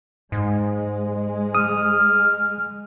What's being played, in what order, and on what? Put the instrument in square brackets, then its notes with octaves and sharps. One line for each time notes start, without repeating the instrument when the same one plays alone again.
[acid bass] G#2 [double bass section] G#3
[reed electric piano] D#6 [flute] F6